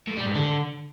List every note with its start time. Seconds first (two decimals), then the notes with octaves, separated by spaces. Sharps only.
0.08 A2
0.17 G3
0.26 G#2
0.36 D3